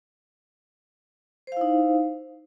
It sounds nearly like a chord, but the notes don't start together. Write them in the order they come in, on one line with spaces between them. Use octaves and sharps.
C5 F5 E4 D#4